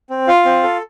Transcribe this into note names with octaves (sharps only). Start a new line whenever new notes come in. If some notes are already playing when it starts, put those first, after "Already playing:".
C4
F4 F5
C4
A4